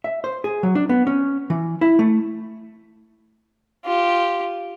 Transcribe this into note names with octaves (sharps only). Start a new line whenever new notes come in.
E5
C5
G#4
F#3
D4
B3
C#4
E3
E4
A3
F4 G4